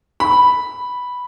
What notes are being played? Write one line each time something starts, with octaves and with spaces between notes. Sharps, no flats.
B5